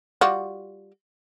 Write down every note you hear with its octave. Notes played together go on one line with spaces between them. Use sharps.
G3 F4 F#4